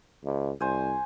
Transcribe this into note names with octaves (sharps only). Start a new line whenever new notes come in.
C#2
C2 C5 G#5